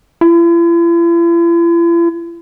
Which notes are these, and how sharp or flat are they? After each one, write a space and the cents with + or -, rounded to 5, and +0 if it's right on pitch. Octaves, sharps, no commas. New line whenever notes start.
E4 +45